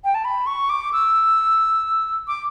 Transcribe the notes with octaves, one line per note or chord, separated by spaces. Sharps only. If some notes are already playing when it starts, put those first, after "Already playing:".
G5
A5
B5
C#6
D6
E6
D6